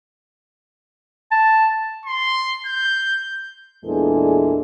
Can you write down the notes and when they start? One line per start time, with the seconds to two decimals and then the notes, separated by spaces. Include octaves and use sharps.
1.32 A5
2.06 C6
2.66 G6
3.84 E2 A#2 E3 G#3 D4 A4